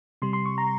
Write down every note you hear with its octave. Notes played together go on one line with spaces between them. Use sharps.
C3 G3 C6
C6
C#6
A#5